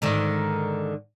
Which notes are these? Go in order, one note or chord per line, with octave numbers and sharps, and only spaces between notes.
G#2 D3 D#3